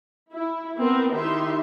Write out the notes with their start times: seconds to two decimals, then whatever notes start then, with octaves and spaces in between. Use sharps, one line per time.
0.32 E4
0.79 B3 C4 A#4
1.13 D#3 D#4 E4 G4 E5 C6